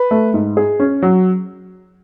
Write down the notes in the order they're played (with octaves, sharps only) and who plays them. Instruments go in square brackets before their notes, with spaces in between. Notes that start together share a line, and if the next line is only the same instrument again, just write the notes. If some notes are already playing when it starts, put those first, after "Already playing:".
Already playing: [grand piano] B4
[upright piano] A3
G#2
G#4
C#4
F#3